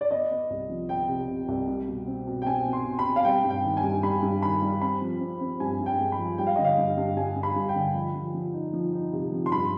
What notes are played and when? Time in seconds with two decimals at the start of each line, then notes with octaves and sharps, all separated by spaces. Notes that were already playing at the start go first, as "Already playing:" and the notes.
0.01 D5
0.11 B3 D#5
0.31 B3
0.50 C2
0.69 F3
0.89 B3 G5
1.09 C3
1.28 C3
1.48 C2
1.68 G3
1.88 B2
2.07 C4
2.27 B2
2.42 G5
2.46 C4 G#5
2.66 B2
2.73 C6
2.86 B2
2.99 B5
3.05 C4
3.16 F5
3.25 G3 G5
3.44 G2
3.50 G5
3.64 D#3
3.77 G#5
3.84 G2
4.03 G3 B5
4.22 G2
4.42 D#3 B5
4.62 G3
4.81 C4 B5
5.02 F3
5.20 C4
5.41 C4
5.60 G2 G#5
5.80 G2
5.86 G5
5.99 G#3
6.12 B5
6.19 F3
6.38 G3 G5
6.47 F5
6.56 D3 D#5
6.64 F5
6.78 G2
6.97 G2
7.17 G3 G#5
7.36 G2
7.43 B5
7.56 G2
7.69 G5
7.76 D3
7.95 F3
8.15 F3
8.34 F3
8.54 D#4
8.73 F3
8.93 D#4
9.13 C3
9.32 F3
9.46 C6
9.52 G2 B5